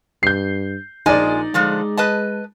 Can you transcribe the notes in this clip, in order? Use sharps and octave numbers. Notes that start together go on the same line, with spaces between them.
G2 G6 C7
A#1 F3 G#3 D#4 D5 G#5
D3 F3 G#3 D4
B4 D#5 A5